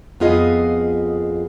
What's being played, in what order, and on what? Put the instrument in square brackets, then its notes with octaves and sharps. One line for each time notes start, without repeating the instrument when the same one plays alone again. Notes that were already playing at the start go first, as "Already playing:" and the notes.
[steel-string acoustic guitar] F2 B3 F4 G#4 D#5